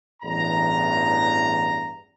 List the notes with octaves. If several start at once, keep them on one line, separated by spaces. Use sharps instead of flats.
A1 E2 G2 A#5